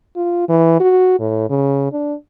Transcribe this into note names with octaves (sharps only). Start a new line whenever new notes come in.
F4
E3
F#4
A2
C#3
D4